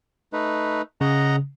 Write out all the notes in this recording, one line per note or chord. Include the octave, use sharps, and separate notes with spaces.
A3 D#4 B4
C#3 D#5 F#5 A#5